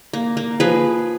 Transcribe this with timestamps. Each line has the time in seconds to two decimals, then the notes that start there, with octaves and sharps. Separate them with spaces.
0.13 A#3
0.37 A#3
0.60 F3 G#4 B4